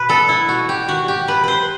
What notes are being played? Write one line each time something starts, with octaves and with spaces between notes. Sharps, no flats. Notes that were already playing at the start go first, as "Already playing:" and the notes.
Already playing: B2 B4
B3 A4
E4
B2 F#4
G4
D#3 F#4
G4
C3 B4
B4 C5